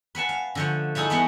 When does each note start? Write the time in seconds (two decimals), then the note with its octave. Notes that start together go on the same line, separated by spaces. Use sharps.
0.15 B4 F#5 G#5 A5
0.29 F5
0.55 D3 F3 A3
0.95 A3 D#4 E4 G#4 A4
1.10 E3 A3 B3 F#4 B4